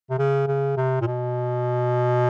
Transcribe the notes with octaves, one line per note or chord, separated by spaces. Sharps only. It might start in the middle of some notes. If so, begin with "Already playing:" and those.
C3
C#3
C#3
C3
A#2
B2